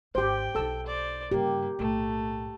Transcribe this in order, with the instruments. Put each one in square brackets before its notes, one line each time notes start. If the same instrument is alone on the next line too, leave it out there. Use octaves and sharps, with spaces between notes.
[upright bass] G#1 [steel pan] G4 C5 [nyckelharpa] G5
[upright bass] B1 D#4 [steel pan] A4 E6
[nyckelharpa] C5 D5
[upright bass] G2 C#3 [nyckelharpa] A#3 [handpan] G4
[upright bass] B1 A2 [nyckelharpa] A3